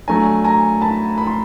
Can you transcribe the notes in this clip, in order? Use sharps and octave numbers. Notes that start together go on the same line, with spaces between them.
F#3 A3 D4 G#5 A#5
G#5 A#5
A5 B5
B5
C6